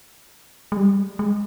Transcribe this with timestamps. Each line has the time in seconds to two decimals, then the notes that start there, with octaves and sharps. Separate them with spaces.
0.72 G#3
0.77 G3
1.19 G#3